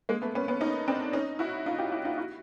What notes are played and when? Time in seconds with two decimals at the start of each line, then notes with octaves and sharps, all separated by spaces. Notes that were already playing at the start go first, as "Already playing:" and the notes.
0.09 G#3 A#3
0.22 A3 B3
0.35 B3 C#4
0.48 B3 C#4
0.61 C#4 D#4
0.88 C4 D4
1.13 C#4 D#4
1.39 E4 F#4
1.66 D#4 F4
1.79 F4 G4
1.92 E4 F#4
2.05 D#4 F4
2.18 E4 F#4